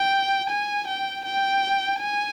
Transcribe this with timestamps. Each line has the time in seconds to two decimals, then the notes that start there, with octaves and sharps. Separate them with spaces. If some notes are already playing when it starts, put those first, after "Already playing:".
Already playing: G5
0.49 G#5
0.87 G5
1.26 G5
2.00 G#5